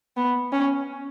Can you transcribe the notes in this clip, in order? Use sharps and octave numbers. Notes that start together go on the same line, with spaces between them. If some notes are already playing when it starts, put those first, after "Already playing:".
B3
C#4